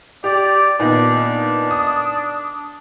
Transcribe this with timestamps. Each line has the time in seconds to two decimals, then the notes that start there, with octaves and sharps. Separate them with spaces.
0.24 G4 D5
0.80 A#2 D#3 B3 D4
1.71 D#6